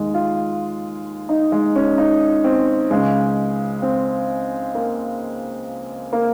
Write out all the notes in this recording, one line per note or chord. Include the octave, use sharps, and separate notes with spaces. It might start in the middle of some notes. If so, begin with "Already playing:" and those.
Already playing: D#2 D#3 G#3
F4
D#4
G#3
C#4
D#4
C4
C#2 C#3 G#3
C4
A#3
A#3